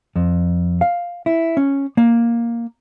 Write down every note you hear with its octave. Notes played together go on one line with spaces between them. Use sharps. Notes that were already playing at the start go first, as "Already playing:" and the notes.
F2
F5
E4
C#4
A#3